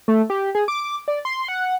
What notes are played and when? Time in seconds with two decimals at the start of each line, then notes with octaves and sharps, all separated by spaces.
0.08 A3
0.30 G4
0.55 G#4
0.68 D6
1.08 D5
1.25 C6
1.48 F#5